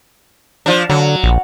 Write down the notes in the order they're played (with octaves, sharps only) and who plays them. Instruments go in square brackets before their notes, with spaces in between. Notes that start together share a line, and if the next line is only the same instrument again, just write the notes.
[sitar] F3 D4
[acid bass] D3 [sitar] F#3
[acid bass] A#1